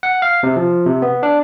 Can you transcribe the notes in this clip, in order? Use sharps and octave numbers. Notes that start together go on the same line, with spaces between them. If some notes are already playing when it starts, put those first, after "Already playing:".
F#5
F5
C3
F3
C3
B3
D4